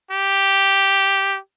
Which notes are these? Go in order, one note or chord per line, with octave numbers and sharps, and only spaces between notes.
G4